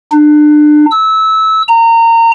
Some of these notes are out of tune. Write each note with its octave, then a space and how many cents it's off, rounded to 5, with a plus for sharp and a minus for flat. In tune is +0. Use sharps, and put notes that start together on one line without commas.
D4 +30
E6 -20
A#5 -25